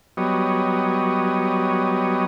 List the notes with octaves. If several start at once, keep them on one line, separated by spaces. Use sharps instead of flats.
F#3 G3 B3 C#5 D#5